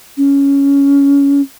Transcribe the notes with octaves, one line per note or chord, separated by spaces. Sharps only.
C#4